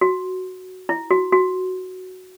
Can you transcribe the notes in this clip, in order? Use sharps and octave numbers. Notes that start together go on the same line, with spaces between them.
F#4
E4
F#4
F#4